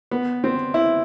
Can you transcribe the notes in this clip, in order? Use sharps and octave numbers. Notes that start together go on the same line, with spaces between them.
B3
C4
E4